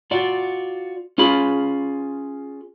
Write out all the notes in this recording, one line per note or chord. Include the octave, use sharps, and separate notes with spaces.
F4 F#4 D5
C#4 F4 G#4 B5